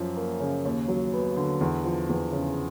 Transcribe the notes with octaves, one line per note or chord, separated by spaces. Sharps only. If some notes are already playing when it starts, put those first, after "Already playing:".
Already playing: F#2 F3
A#3
C#3
D#2
F#3
B3
D3
E2
F3
E2
C#3